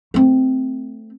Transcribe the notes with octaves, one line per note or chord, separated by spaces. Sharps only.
A3 C4